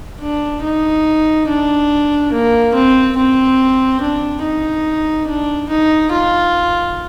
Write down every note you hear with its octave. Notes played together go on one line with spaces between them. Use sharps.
D4
D#4
D4
A#3
C4
C4
D4
D#4
D4
D#4
F4